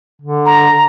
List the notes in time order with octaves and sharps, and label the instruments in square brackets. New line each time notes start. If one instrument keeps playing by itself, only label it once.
[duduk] D3
[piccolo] A#5